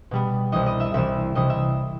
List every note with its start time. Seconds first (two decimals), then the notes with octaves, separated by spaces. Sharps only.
0.11 B2 G3 B3
0.52 C2 C3 E3 D#5 D#6
0.66 D#5 D#6
0.80 E5 E6
0.94 C2 C3 E3 E5 E6
1.35 C2 C3 E3 D#5 D#6
1.49 E5 E6